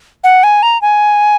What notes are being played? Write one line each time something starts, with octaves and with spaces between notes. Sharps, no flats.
F#5
G#5
A#5
G#5